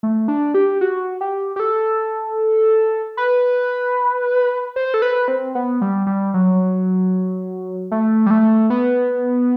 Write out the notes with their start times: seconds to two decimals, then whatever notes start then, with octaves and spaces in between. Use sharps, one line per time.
0.03 A3
0.28 D4
0.54 G4
0.81 F#4
1.21 G4
1.56 G4
1.60 A4
3.17 B4
4.76 C5
4.94 A4
5.02 B4
5.28 C4
5.55 B3
5.81 G3
6.07 G3
6.34 F#3
7.91 A3
8.26 G3
8.31 A3
8.70 B3